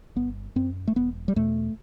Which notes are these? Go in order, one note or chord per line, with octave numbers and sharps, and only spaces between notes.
G1 B3
F#2 C4
A3
E1 B3
G3
E2 B2 A3